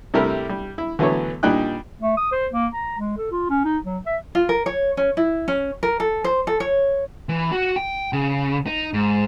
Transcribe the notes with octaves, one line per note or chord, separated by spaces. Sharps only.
C3 G3 A3 E4 G4 A#4
G3
E4
D3 E3 F#3 A3 B3 C#5
A#2 G3 D4 D#4 G5 F#6
A3
D#6
C5
A#3
A#5
G#3
A4
F4
C#4
D#4
F#3
E5
F4
A#4
C#5
C#4
E4
C#4
A#4
A4
C5
A4
C#5
E3
F#4
G5
C#3
D#4
G#2